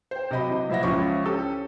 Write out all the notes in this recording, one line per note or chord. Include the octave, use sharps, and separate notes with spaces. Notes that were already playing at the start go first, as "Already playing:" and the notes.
C5 G5
C3 F#3 D#5 B5
E3 D#5
A#1 E4 C5 E5 F#5 A#6
C#2 F3 C#4 E4 C#6 D6
C#4 G4 A4